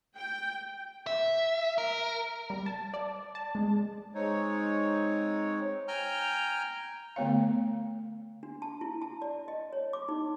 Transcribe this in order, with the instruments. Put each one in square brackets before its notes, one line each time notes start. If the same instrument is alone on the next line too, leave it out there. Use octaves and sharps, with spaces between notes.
[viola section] G5
[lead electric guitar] E5
A#4
[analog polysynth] G3
A5
D5
A5
G#3
[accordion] G#3 C4 D#4 C#5
[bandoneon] G5 G#5 A#5 F6 G6
[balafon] D3 A3 B3 C#5 F5
[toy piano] D4
A5
E4
A5
D5
D#5
C#5
D6
D#4